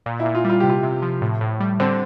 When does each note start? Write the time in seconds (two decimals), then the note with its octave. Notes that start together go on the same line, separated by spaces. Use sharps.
0.06 A#2
0.20 E4
0.25 A#2
0.35 F4
0.44 G3
0.50 F4
0.60 C3 G4
0.70 F4
0.83 C3
1.02 F3
1.22 A2
1.41 A2
1.60 G3
1.79 D3 C4